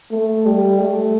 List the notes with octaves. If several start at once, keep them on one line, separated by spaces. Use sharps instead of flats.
A3
G3
A3